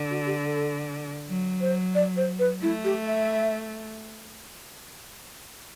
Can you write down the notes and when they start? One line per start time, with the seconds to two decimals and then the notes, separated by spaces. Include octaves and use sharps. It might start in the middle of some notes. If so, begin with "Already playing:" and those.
Already playing: D3
0.10 F#4
0.26 G4
0.44 A4
1.28 F#3
1.61 C5
1.95 D5
2.17 C5
2.39 B4
2.62 A3 E4
2.84 G4
3.07 E5